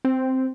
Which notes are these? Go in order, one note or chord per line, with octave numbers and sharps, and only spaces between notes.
C4